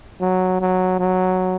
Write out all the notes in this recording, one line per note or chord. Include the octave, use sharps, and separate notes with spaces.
F#3
F#3
F#3